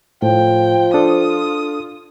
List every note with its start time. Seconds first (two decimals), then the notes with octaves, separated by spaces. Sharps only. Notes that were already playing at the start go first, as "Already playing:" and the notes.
0.22 A2 F3 G5
0.94 D4 F4 A4 D#6